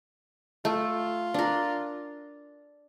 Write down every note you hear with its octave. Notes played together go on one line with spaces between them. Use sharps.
A3 F4
D4 A#4